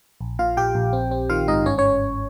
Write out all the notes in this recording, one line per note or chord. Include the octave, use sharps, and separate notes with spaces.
A#1
A#2 F4 F5
A#1 G4 G5
A#1
C4
C4
D#3 F4 F5
G#2 D#4 D#5
G1 C#4 C#5
C#4 C#5